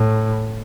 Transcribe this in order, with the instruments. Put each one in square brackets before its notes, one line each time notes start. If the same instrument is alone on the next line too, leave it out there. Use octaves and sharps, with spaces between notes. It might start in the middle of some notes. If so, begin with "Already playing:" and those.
Already playing: [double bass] A2